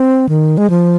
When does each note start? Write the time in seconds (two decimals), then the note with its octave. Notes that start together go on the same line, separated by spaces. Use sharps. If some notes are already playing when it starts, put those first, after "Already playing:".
Already playing: C4
0.29 D#3
0.58 G#3
0.70 F3